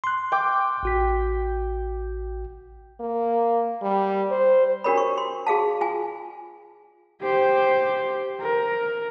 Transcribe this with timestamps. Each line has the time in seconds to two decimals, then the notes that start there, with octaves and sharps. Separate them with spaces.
0.04 C6 F#6
0.32 G5 D6
0.83 A1 F#4 B6
3.00 A#3
3.82 G3
4.31 C5
4.84 D4 F#4 G4 A#4 C#5 B5
4.98 C#6
5.18 C6
5.47 F#4 G#4 F5 A5
5.81 F4 G#5
7.22 G4 C5
8.41 A#4